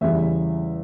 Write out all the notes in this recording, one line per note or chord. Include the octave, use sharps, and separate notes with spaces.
E2 C#3 E3 G3 E5